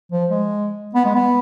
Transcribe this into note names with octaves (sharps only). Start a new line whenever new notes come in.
F3
G#3
B3
G#3
B3